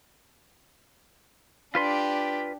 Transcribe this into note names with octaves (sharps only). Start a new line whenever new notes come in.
D4 F4 G4 B4 C6